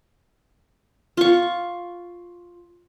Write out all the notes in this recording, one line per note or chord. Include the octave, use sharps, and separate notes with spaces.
F4 C#6